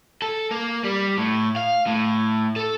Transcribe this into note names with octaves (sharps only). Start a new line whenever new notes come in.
A4
A#3
G3
A2
F5
A2
A4